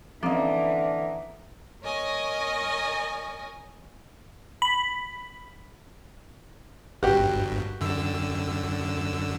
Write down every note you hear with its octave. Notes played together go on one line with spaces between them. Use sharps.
D3 E3 F3 A#3 C4 C#4 D#5
A#4 C#5 D#5 G#5 C#6
B5
G1 G2 F#4 G4
F#2 D3 E6